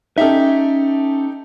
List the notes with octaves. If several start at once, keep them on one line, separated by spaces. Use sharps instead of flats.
C#4 D#4 G4 A4 E5